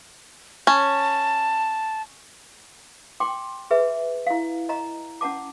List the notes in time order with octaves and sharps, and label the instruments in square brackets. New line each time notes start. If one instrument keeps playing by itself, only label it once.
[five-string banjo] C#4 [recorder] A5
[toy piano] G5 C6 D6
G#4 B4 E5
E4 F5
D#5 A#5
C#4 F#5 A5 D6